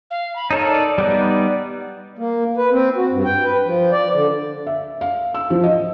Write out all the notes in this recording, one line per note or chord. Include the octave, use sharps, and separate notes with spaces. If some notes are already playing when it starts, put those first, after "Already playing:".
F5
B5
D#4 A4 A#4 C#5
D5
G3 B3 D#4
A#3
B4
C4
F#4
G2
G5
B4
F3
D5
D3
E5
F5
E6
F3
D#5